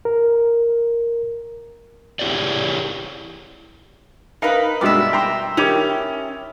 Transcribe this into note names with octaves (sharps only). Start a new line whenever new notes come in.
A#4
E4 G4 G#4 C#5 D5
D#4 A#4 B4 F5 A#5
G2 B2 G#3 D5 E5
G5 A#5 C6
D#3 C#4 E4 G4 D6